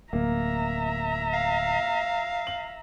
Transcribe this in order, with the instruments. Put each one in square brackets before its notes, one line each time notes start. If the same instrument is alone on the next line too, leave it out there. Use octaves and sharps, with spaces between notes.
[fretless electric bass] D1 [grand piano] A#3 [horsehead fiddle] E5 A#5
[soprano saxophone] F5
[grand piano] F#7